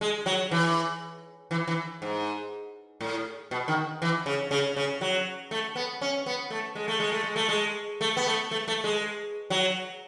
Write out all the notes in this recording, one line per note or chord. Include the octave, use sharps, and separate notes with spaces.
G#3
F#3
E3
E3
E3
G#2
A2
B2
D#3
E3
C#3
C#3
C#3
F#3
A3
B3
C#4
B3
A3
G#3
A3
G#3
A3
G#3
A3
G#3
A3
B3
A3
A3
A3
G#3
F#3